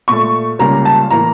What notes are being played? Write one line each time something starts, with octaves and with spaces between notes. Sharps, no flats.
A#2 A3 C#6
C#2 C#3 G3 A#3 A#5
A5
A2 E3 A#3 A#5